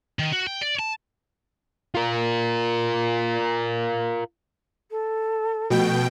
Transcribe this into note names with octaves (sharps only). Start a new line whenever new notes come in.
D#3
F#4
G5
D5
A5
F4 A#4
A4
B2 F3 A3 F#4 G5